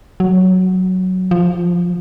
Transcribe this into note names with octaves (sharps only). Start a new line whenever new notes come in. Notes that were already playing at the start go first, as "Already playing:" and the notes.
F#3
F3